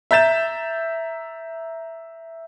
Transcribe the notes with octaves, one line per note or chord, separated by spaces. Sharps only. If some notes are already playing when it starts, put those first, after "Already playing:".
E5 A#5 G6 A6 E7